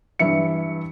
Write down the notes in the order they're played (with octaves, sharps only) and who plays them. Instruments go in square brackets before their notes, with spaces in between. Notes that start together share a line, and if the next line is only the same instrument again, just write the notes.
[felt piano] G2 E3 E4 E5 C#7